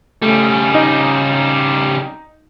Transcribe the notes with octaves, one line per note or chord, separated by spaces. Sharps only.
C#3 G3 A3
D#4 D#5